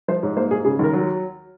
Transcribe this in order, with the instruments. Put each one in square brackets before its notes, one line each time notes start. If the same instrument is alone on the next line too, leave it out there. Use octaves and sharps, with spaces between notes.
[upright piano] F3 C5
G#2 C#5
A#3 C5
G#2 G#4
C#3 G#4
D#2 A#4
F#3